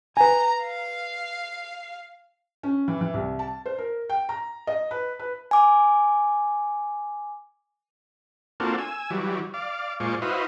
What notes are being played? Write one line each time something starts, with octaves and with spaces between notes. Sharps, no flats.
B4 G#5 A#5
F5
C#4
E3
E3
C2
A5
C5
A#4
G5
A#5
D#5
B4
B4
G#5 D6
A#3 C4 D4 F4 F#4 A4
G#5 E6
E3 F#3 G3
D5 F5
A#2 G#3 F4 C5 D5 C#6
E4 F#4 B4 C5 D#5 F5